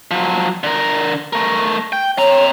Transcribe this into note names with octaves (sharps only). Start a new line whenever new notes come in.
F3 F#3
D3 A#4
A3 A#4
G5
C4 C#5 A#5